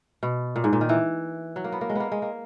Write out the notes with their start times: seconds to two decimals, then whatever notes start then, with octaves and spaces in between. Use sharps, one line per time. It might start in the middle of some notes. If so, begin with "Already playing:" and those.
0.23 B2
0.56 A#2
0.64 G#2
0.73 A#2
0.81 D#3
0.89 E3
1.56 F#3
1.64 A#3
1.72 B3
1.81 A#3
1.90 G#3
1.95 A#3 B3
2.12 G#3
2.22 A#3